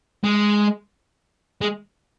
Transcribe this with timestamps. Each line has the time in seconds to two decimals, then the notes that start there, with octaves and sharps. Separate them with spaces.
0.24 G#3
1.61 G#3